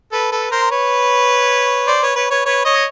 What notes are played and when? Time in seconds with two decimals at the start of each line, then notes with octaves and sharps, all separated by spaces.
0.12 A4 B4
0.32 A4 B4
0.51 A#4 C5
0.71 B4 C#5
1.87 C5 D5
2.02 B4 C#5
2.16 B4 C#5
2.30 B4 C#5
2.45 B4 C#5
2.65 C#5 D#5